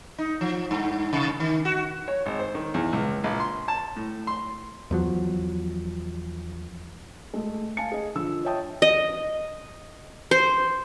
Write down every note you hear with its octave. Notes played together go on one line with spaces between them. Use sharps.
D#4
F3
G2
C3
D#3
F#4
C#5
G#1
C5
D#3
E2
C#2
A#1
C6
A5
A2
C6
E2 F3 F#3
G#3 A3
F5 G#5 A5 C#7
G#4 D#5
D3 F3 E6
C#5 D#5 E5 G5 A5 D#6
D#5
C5